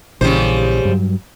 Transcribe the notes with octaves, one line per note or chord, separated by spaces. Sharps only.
A#1 C#3 E3 G3 C5
G2 F#3